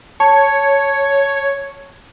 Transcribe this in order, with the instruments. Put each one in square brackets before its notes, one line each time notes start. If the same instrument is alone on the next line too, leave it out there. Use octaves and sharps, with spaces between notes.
[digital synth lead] C#5 [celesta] A5